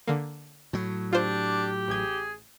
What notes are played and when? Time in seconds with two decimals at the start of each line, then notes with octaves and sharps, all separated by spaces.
0.08 D3 A#3
0.73 A2 F#3
1.13 D4 F4 G4 C5
1.88 A1 G#4 G#6